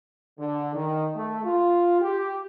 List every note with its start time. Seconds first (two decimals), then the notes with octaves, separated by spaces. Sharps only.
0.40 D3
0.75 D#3
1.15 A3
1.45 F4
2.02 G4